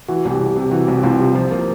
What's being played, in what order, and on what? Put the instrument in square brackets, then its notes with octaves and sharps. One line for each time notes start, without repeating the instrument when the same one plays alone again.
[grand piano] E3 [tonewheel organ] F#4
[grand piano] C2
[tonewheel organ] G4
[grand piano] C2
[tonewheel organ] G4
[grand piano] C3
[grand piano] E3 [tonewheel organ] F#4
[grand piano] C2
[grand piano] C2 [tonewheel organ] F4
[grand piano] C3
F3
A#3